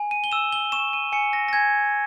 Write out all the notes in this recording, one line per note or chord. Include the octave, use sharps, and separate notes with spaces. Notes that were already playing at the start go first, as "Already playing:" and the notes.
Already playing: G#5
D#7
G7
E6 E7
G7
C#6 E7
D#7
G#5 C#7
A#6
A#6
G#5 G#6